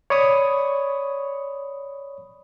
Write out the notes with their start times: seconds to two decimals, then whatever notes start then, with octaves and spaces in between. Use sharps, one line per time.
0.10 C#5 D5 B5 C#6 D#6